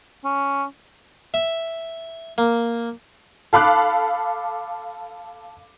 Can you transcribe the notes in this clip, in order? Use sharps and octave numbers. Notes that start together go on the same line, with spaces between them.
C#4
E5
A#3
A4 F5 B5 D6 F#6